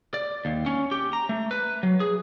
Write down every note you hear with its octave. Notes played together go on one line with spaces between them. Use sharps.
D5
D#2
C#4
G4
A#5
A3
B4
F#3
G#4